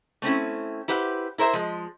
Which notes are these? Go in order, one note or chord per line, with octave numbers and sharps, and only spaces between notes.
A3 C4 C#4 E4
E4 G4 B4 C5 F#5
E4 A#4 C5 D5 E5
F3 G#3